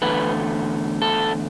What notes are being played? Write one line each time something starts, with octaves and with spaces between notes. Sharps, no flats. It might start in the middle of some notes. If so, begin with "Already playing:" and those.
E2 D3 A3 B4
A4